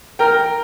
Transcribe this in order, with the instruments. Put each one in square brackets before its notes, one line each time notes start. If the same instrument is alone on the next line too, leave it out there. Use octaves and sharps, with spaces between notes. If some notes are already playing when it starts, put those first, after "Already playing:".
[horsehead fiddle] A#4 [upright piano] G5 A#5